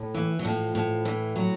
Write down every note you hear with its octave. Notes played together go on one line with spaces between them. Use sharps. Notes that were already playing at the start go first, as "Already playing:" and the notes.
Already playing: A2
E3
F#3
A2 F3
A2
E3
F#3